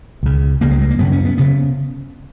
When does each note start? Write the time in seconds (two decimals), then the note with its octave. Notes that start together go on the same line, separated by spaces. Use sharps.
0.23 C#2 C#3
0.61 C#2 C#3 A#3
0.71 G#3
0.81 G#3
0.91 A#3
0.99 F#2 C#3 B3
1.12 C#4
1.25 B3
1.38 C#3 B3